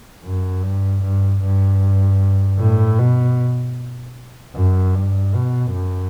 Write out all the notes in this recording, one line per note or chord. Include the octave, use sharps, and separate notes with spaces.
F#2
G2
G2
G2
A2
B2
F#2
G2
B2
F#2